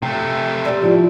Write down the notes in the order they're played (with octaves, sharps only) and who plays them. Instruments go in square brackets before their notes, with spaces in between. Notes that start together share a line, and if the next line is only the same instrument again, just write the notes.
[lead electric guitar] C3 A3 [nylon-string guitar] G5
[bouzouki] G3 C4 G4
[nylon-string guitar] F3 E4